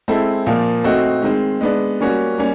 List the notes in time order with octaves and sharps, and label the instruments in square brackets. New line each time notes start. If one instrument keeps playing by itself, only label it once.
[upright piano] G#3 C4 E4 A4
A#2 F3 A#3
A3 C4 D#4 F#4
D#3 G#3 C4
G#3 B3 D4
G3 A#3 C#4 F#4
G3 A#3 C#4